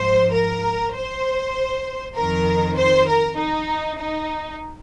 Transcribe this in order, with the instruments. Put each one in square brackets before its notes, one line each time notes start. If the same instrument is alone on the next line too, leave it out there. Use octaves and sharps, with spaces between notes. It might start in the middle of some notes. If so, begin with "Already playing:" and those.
Already playing: [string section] G#2 F3 C5
A#4
C5
F2 D#3 A#4
C5
A#4
D#4
D#4